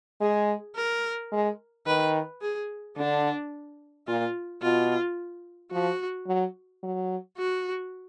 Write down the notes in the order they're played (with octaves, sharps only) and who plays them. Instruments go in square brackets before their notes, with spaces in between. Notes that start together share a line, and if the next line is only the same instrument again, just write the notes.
[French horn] G#3 [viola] G#4
[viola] A#4
[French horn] G#3
[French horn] D#3 [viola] B4
[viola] G#4
[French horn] D3 [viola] D4
[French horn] A#2 [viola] F4
[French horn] B2 [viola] F4
[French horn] F3 [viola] F#4
[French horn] F#3
F#3
[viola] F#4